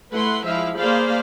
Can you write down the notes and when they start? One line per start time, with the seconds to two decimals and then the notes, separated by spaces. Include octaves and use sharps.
0.12 A3 E4 B4 F#5 C6
0.44 F3 G#3 E4 E5 F5
0.77 A#3 G#4 C5 D5 F5 B5